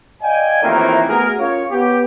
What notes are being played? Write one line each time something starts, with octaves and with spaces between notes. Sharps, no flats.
D5 D#5 F5 G5 G#5
F2 A2 C3 D#3 E3 A#3
A3 B3 F#4 G#4 A#4
C#4 F4 A#4 C#5
B3 G4